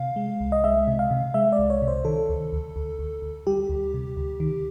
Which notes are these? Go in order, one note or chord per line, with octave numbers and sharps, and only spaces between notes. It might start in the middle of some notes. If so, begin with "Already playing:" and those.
Already playing: C3 F5
G#3
C2
D#5
G#3 E5
C3
F5
C3
G#3 E5
D5
C2
C#5
C3
C5
D#3 A4
D2
D2
D2
D2
D2
G3 G4
D2
C3
D2
D#3